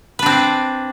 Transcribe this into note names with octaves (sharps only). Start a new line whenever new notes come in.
C4 D4 B4